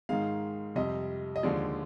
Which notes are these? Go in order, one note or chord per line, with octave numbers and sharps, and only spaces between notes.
G#2 D#3 G#3 F5
F2 C3 G3 D#5
D#5
D#2 D3 F3 G#3 D5